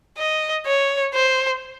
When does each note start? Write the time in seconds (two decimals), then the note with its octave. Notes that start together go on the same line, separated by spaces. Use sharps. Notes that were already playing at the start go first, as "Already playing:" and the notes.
0.18 D#5
0.66 C#5
1.14 C5